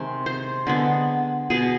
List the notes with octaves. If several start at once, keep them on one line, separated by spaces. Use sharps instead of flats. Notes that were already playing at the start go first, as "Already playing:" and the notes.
Already playing: C3 D#3 G#3 C5
C5
D3 G#3 B3
B2 B3 G#4